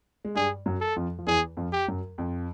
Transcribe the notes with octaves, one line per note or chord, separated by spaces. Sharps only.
G#3
G2 G3 G#4
F#2 F#3
A4
F2 F3
F3
E2 E3 G#4
F2 F3
G4
F#2 F#3
F2 F3